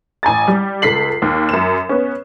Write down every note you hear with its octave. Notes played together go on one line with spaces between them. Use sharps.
A1 G#5 A#5 A6
G3
C#2 A4 B6 C7 F#7
D#2
F#2 E7
B3 C#4